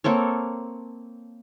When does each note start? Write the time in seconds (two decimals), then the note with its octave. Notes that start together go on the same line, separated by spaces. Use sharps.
0.04 A#3 C4 A4 C#5